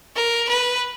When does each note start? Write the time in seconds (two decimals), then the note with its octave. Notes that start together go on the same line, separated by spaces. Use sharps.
0.16 A#4
0.49 B4